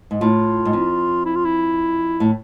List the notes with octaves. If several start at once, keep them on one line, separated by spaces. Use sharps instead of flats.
G#2
A2 F4
G#2
F2
E4
F4
E4
A2